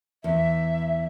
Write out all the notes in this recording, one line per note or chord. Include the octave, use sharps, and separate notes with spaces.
E2 E5